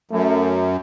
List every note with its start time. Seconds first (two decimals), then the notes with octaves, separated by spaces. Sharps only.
0.11 F#2 A3